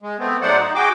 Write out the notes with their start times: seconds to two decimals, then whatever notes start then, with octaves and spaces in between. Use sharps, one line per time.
0.02 G#3
0.19 A3 B3 C4
0.42 G#2 F#3 A3 C5 D5 F#5
0.58 D#4
0.75 F#4 G#4 G5 D6